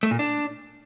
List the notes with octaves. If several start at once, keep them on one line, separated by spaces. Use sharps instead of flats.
A3
A#2
D4